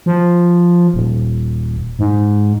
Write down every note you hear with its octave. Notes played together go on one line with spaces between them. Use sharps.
F3
D#1
G#2